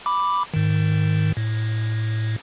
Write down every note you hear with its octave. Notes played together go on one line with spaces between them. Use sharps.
B5 D6
G#2 D#3
A2